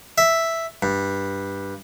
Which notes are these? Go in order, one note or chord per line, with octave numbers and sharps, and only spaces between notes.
E5
G2